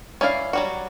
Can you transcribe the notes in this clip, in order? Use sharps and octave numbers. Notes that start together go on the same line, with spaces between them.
C#4 E4 D5 F5
F#3 G3 F#4